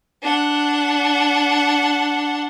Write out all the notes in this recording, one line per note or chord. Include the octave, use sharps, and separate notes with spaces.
D4 F#5